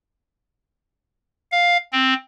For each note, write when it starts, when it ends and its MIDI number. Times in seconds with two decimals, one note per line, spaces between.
1.52 1.77 77
1.92 2.14 60